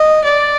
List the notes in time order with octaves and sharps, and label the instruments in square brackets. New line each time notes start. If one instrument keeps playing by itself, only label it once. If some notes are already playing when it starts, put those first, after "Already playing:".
Already playing: [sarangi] D#5
D5